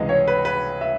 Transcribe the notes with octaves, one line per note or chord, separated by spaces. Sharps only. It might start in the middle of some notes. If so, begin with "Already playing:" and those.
Already playing: C#2 C3 E3 G#3 D#5
C#5
B4
B4
E5